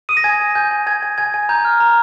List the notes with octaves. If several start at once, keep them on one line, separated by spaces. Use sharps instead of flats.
D#6 D#7
A#6
G#5 G#6
G#5
G#5 G6
G#5
G#5 G#6
G#5
G#5 G#6
G#5
A#5 G6
F6
A#5